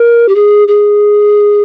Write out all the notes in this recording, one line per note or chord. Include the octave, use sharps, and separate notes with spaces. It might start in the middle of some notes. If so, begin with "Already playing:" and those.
Already playing: A#4
G4
G#4
G#4